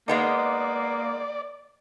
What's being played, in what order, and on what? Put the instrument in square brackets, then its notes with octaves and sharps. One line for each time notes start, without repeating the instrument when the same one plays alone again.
[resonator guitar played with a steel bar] G#3 B3 D#4 [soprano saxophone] A#3 [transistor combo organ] D5